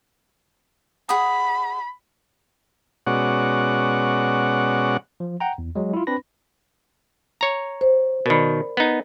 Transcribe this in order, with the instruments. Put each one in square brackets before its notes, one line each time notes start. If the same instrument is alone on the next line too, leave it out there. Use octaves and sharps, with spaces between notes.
[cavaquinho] G#4 F#5 D#6 [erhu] B5
[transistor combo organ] B2 G#3 C#4 F#4 D5 F#5
[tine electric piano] F3
F#5 G5 A#5
E2
F#3 G#3
E4 F4
C4 D4 B4 B5 A#6
[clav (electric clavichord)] C#5 A#5
[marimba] C5
[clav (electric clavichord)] B2 D#3 [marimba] A#4 D5 B5
[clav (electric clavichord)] B3 D#4